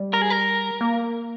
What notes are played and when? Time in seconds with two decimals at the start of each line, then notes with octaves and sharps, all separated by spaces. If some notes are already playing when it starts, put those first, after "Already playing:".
Already playing: G3
0.14 A#4
0.22 G#4
0.30 A#4
0.81 A#3